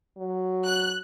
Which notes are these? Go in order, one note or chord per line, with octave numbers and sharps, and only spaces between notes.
F#3
F#6